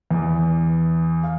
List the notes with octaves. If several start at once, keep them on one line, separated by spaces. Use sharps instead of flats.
E2
F5